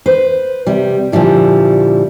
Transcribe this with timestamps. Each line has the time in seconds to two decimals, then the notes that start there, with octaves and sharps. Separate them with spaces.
0.06 B4 C5
0.67 C3 G3
1.12 A#2 D3 F3 G3 E4